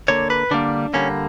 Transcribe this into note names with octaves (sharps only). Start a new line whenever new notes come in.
D3 A#3 C#5
B4
D3 G3 A#3 D4
D3 G3 A#3 C#4